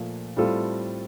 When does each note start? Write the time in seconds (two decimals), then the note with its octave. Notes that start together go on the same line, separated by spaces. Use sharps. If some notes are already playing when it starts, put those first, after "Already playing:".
Already playing: A#2 F3 A3
0.37 A2 G3 C4 F4 A4